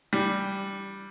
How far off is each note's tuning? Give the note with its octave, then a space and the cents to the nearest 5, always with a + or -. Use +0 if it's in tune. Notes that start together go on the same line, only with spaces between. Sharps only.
E3 +15 G3 +0 D4 -15